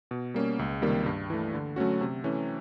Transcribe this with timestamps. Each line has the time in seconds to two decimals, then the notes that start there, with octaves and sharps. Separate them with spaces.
0.11 B2
0.34 G3 A#3 C#4
0.59 C#2
0.82 C3 D#3 G3 A#3
1.06 G2
1.30 E3 A3
1.54 D3
1.76 F#3 A3 C#4 F#4
2.01 C3
2.24 E3 A3 C#4